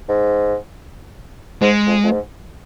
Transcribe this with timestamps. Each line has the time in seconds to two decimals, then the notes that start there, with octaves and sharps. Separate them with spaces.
0.09 G#2
1.62 G#2 G#3
1.87 F2
2.03 F2
2.11 G#2